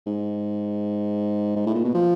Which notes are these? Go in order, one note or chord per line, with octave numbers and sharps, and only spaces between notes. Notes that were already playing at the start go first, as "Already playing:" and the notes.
G#2
G#2
A2
A#2
B2
F3